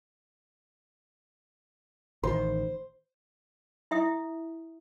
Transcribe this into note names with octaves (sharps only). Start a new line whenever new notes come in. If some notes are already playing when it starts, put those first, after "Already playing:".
A1 D#3 C5
E4 E5 D#6